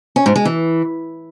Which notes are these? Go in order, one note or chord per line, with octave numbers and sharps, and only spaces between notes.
C#4
G#2
G#3
E3